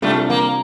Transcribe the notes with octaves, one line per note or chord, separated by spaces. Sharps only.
C3 G3 A3 D4 F4
A#3